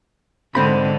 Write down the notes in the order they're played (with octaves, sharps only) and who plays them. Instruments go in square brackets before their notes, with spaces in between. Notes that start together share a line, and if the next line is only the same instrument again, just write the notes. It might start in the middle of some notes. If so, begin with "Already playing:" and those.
[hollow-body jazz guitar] C2 C4 B5 [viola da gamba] G#2 D3